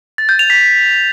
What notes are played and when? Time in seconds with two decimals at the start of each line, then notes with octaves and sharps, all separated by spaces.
0.18 A6
0.29 G6
0.39 F7
0.50 B6